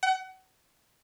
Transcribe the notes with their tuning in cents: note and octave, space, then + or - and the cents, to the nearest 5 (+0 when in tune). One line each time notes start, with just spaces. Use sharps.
F#5 +30